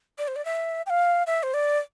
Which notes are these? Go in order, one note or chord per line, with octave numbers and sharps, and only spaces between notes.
D5
C5
D5
E5
G5
F5
E5
C5
D5